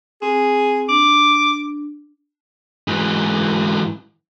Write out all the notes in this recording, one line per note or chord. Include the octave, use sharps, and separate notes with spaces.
C4 G#4
D4 D6
G#2 E3